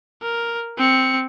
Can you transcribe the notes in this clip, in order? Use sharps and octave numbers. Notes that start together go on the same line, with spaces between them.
A#4
C4 C#7